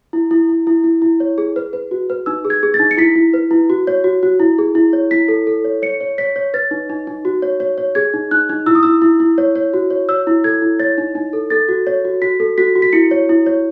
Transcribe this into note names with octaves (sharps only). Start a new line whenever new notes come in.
E4
E4
E4
E4
E4
E4
C#5
G#4
B4
B4
F#4
B4
D#4 E6
G#4
G#6
G#4
A6
D#4
C#7
E4 B6
E4
B4
E4
F#4
C#5
F#4
F#4
E4
G#4
E4
C#5
E4 B6
A4
A4
C#5
C#5 C#7
C#5
C#5 B6
C#5
B4 A6
D#4
D#4
D#4
F#4
C#5
C#5
C#5
G#4 G#6
D#4
D#4 F#6
D#4
E4 E6
D#6
E4 E6
E4
E4
C#5
C#5
F#4
C#5
C#5 E6
E4
A4 G#6
E4
C#5 A6
D#4
D#4
A4
A4 A6
F#4
C#5
F#4
F#4 B6
A4
F#4 B6
F#4
B6
E4 C#7
C#5
E4
C#5